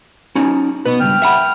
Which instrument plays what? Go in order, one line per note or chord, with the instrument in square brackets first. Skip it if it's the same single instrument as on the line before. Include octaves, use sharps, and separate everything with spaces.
[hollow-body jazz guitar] C#4 D#4 F#4
[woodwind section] B2 [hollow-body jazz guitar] B3 B4
[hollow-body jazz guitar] C#2 G2 [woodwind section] G5 F6
[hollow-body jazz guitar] E5 F#5 B5